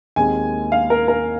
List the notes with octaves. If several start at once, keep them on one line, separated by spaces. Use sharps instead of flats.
D#2 D#3 G#3 C4 G#5
F5
A#4
A#4